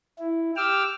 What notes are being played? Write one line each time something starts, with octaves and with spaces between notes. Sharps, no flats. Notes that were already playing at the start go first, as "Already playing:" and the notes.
E4
G4 G5 D6 E6 F6